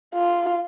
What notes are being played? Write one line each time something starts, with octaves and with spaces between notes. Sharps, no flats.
F4